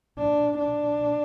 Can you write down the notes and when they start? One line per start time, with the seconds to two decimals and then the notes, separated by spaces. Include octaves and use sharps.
0.18 D4
0.59 D4